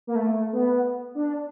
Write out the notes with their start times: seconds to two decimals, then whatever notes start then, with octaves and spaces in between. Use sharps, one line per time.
0.07 A#3
0.15 A3
0.53 B3
1.15 D4